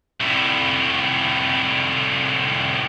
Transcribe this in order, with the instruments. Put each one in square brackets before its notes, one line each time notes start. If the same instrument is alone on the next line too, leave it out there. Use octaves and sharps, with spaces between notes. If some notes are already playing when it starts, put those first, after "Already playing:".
[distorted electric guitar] C2 A2